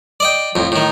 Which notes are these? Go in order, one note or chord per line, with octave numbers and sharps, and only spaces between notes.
D5 D#5 G5
F2 A2
A2 D#3